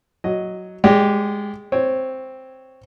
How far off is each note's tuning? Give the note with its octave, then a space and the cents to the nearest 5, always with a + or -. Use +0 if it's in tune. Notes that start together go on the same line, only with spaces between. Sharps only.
F#3 +0 D#5 +0
G#3 -10 G4 +0 D5 -35
C4 +0 C#5 +0